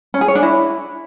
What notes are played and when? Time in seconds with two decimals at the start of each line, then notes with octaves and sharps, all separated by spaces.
0.14 C#4
0.21 G#4
0.28 C#5
0.35 D4
0.43 E4